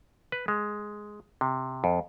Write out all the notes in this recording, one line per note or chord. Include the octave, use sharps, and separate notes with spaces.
B4
G#3
C3
F2